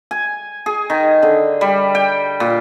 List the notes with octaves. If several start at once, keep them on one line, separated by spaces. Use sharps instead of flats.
G#5
G#4
D#3
D3
G3
G5
A#2